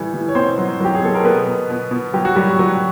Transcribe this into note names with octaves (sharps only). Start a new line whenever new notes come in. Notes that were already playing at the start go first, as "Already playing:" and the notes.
Already playing: A2 E3 G3
E3
C#5
B2 C4 C5
F#3
F#3 G4
G#4
B2 A4
A#4
B2 B3 B4
B2
B2
B2
F#3 G4
F#4
F#3 G3 G4
F#3